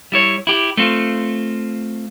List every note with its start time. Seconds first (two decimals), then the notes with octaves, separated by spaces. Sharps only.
0.12 G3 E4 C#5
0.47 E4 G4
0.77 A3 C4 F4